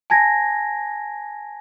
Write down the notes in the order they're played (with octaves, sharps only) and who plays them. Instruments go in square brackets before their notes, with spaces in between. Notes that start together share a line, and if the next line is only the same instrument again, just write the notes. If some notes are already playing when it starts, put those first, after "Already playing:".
[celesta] G#5 A5 G#6 A#6